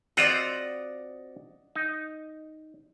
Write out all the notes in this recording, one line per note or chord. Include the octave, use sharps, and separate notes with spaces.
C4 F4 F#4 D5 D#5 F#5
D#4